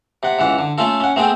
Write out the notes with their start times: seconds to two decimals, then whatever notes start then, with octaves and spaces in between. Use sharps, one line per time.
0.23 C3 F#5
0.39 C#2 E3 F#5
0.59 D3
0.78 A3 C#4 F4 A4
1.00 C#4 F#5
1.16 A3 B3 C4 G#4 G5